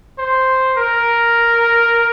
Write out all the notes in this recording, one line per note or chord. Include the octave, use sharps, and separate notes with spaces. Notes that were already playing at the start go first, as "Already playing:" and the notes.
C5
A#4